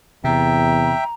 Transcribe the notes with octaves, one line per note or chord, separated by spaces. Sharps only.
E2 C3 E5 G5 A#5